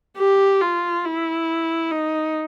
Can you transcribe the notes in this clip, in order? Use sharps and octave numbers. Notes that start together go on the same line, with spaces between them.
G4
F4
E4
D#4